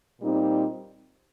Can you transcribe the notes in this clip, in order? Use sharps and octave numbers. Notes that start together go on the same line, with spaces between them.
A#2 G3 C4 D#4